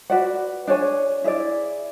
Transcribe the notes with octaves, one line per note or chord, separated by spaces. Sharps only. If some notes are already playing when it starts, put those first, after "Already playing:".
F#4 B4 D5 F#5
D4 G#4 C#5 G#5
E4 G#4 D5